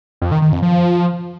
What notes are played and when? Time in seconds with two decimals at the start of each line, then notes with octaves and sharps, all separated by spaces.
0.22 F2
0.32 D#3
0.42 D#3
0.52 F2
0.62 F3